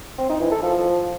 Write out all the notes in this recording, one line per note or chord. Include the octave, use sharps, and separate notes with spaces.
C4
D#4
E3
A4
F3